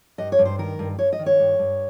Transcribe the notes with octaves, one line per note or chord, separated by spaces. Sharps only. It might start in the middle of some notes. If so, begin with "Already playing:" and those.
G2 D#5
C#5
G2
C5
D#3 A#4
G2
G2 C#5
D#5
D#3
C#5
G2
G2